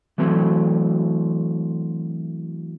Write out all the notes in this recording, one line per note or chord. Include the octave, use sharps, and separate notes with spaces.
E3 F#3 A3 C4